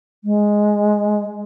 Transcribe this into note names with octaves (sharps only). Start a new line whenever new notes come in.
G#3